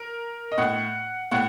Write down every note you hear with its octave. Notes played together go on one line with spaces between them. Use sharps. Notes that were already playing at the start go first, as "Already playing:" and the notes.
Already playing: A#4
D#5
A2 F#5
A2 F#5